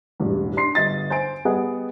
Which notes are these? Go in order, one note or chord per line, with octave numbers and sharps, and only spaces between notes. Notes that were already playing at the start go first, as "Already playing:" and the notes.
E1 A1 G2
D4 C6 C7
G1 D#5 A6
C5 G#5 D7
G3 B3 G#4 D#5 F#5